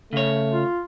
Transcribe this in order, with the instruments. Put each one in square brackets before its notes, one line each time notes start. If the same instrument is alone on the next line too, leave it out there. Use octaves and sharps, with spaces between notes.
[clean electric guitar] C#3 C#5 [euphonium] A3
[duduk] F4